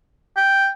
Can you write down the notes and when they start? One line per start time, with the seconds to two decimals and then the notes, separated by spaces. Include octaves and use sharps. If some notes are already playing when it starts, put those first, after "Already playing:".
0.37 G5